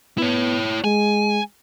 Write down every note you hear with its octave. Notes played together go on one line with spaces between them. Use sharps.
B3 E4 C#5
G#3 G#5